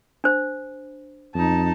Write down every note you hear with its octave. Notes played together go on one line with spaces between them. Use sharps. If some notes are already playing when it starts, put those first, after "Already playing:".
D4 C5
F2 D#4 A5